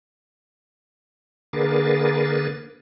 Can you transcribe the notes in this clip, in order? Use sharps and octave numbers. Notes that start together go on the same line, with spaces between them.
D3 A#3 G#4 A#4 B4 A6